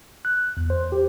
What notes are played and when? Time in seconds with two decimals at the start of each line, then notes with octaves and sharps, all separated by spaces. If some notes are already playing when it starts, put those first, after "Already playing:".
0.25 F#6
0.57 E2
0.70 C5
0.92 G4